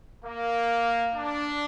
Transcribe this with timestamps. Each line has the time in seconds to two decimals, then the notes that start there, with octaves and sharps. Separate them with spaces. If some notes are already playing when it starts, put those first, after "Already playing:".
0.25 A#3
1.15 D4